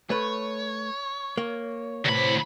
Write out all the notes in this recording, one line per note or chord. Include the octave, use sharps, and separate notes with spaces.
A3 B4 C#5
A#3
D2 A2 C3 E3 B5